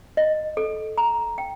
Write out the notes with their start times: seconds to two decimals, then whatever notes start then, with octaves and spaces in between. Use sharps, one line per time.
0.17 D#5
0.57 A4
0.98 A#5
1.38 G5